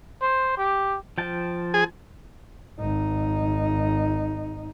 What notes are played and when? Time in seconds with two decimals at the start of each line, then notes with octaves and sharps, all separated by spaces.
0.21 C5
0.57 G4
1.18 F3 G5 A5
1.74 G#4
2.80 G#1 D#4